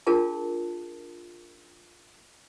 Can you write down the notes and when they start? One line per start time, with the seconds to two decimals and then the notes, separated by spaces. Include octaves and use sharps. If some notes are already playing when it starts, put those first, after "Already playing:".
0.07 D4 F4 G#4 A#4 A5